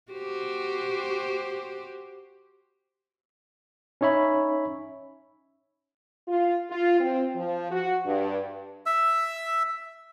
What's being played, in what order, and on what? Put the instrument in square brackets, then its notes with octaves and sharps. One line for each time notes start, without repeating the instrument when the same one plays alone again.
[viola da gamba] F#4 G4 C5
[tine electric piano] C#4 D#4 C#5 E5 B5
[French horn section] F4
F4
C4
F3
F#4
G2
[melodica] E5 E6